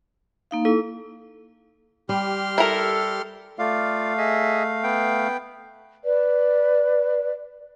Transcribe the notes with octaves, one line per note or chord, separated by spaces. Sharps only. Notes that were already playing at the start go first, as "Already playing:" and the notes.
A#3 D#4 F5
E4 A4
G3 G4 C6 F6
E4 A4 A#4
A3 F4 D5 F5
G#4 D#5 E5
B3 G5
B4 D5